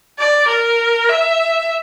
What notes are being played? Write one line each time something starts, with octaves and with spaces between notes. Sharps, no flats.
D5
A#4
E5